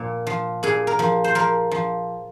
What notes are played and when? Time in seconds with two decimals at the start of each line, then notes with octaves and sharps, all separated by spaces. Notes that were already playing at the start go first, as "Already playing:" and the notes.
Already playing: A#2 F3
0.27 F3
0.63 A#2 G#4
0.87 A#4
0.99 F3
1.24 C5
1.35 F3 A#4
1.71 F3